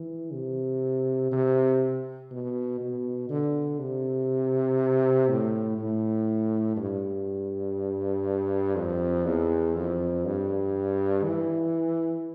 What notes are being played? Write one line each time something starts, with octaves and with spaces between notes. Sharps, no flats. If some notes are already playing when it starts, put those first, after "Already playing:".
Already playing: E3
C3
C3
B2
B2
D3
C3
A2
A2
G2
F2
E2
F2
G2
E3